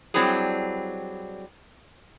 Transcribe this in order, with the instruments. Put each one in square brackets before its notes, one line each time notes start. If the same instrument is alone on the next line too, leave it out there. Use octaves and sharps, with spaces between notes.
[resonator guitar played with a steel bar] F#3 G3 C4 D4 E4 G#4